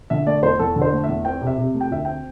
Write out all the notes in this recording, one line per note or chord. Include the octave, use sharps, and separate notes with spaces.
D3 E5
A3 D5
E2 C5
E2 A4
D3
C5
A3
E5
E2
C4 G5
C3
E5
C3
A3
G5
D2 E5
C4 G5